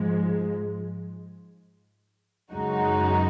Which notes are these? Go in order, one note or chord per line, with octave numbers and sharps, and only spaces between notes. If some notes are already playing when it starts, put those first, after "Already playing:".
Already playing: G#2 F3 G#3
F#2 C#3 G#3 D#4 F#4